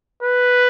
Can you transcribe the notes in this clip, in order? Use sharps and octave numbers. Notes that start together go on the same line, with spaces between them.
B4